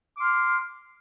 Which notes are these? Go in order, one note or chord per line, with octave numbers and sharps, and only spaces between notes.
C6 D6 F6